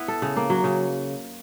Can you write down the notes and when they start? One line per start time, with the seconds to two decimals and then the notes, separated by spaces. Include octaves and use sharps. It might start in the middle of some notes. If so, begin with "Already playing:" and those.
Already playing: B3 E4
0.08 A4
0.22 C#3
0.36 A#3
0.50 F#3
0.64 C#3